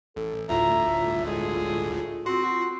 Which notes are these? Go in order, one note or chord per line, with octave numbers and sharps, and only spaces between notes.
A1 A4
G1 D2 A2 F4 E5 A#5
G#3 G#4 A4
C4 F#4 C6